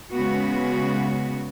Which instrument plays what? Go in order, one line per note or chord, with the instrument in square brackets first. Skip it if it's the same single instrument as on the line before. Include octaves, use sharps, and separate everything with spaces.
[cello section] C#3 G#3 B3 F#4